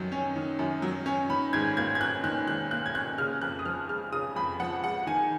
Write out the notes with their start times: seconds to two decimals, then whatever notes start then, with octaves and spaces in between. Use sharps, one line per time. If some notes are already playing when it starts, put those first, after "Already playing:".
Already playing: F#2 D#3 F#3
0.12 C#4
0.36 D#3
0.59 F#2
0.82 F#3
1.06 C#4
1.29 D#3 B5
1.53 G#2 G#6
1.77 A#3 G#6
1.95 G#6
2.00 C#4 F#6
2.24 D#3 F#6
2.48 G#2 F#6
2.71 A#3 F#6
2.86 G#6
2.95 C#4 F#6
3.18 C#3 F6
3.41 F2 F#6
3.59 D#6
3.66 F3 F6
3.89 G#3 F6
4.12 C#3 D#6
4.36 F2 B5
4.60 F3 F#5
4.84 G#3 F#5
5.06 D#3 G#5